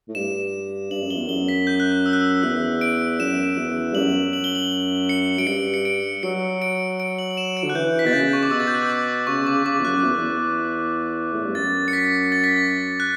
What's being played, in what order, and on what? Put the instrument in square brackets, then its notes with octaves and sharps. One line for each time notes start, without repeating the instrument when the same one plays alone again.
[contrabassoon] A2
[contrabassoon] G2 [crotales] E7
[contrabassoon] G2 [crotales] F#7
[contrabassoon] F#2
[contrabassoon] E2 [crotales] G7
[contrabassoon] F#2 [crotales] G7
[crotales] B6
G6
F#6
G6
E6
F#6
E6
[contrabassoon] E2 [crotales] F#6
[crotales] D7
[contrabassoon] F#2 [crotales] E7
[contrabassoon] E2
G2
[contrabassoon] F#2 [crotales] F#7
[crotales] F#7
G7
F#7
C#7
[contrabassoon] F#2 [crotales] D7
[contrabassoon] G2 [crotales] C#7
[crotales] C#7
D7
[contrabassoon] F#3 [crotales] C#7
[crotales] D7
D7
F#7
F#7
E7
D7
[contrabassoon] D3
[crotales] F#6
[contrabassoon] E3 [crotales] G6
[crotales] B6
[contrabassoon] B2 [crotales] A6
[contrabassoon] C#3 [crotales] G6
[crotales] C#6
D6
[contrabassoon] B2 [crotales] E6
[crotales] A6
G6
F#6
E6
D6
[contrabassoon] C#3 [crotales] C#6
[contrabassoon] C#3 [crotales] D6
[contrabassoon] C#3 [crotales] D6
[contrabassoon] E2
[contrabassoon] F#2 [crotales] F#6
[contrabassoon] E2
E2
A2
G2
[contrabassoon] F#2 [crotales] A6
[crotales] C#7
B6
A6
B6
A6
F#6